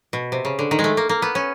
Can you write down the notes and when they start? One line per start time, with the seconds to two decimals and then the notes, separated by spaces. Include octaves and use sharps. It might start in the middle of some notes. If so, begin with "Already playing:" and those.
0.13 B2
0.32 C3
0.45 C#3
0.59 D3
0.71 D#3
0.79 G#3
0.84 A3
0.97 A#3
1.09 A#3
1.22 B3
1.35 C#4